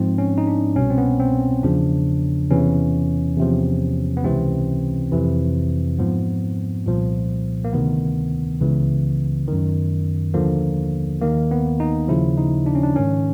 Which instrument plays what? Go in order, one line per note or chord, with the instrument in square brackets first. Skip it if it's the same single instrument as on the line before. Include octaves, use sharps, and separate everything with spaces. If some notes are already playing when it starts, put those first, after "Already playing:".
Already playing: [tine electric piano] G#2 F3 C4
C#4
D#4
D4
C2 B2 C#4
C4
B3
C4
E2 C#3 F3 D4
E2 C3 E3 C#4
E2 C3 F3
B3
C#2 C3 E3 C4
F2 C3 E3
G#2 F3 B3
C2 A#2 F3
A#3
D2 C3 D#3 B3
C#2 C#3 E3
F#2 D#3
D#2 D3 F3 A#3
D#2 D#3 A#3
B3
D#4
D#2 C#3 F3 E4
D#4
D4
C#4
D4
G#2 D#3 C#4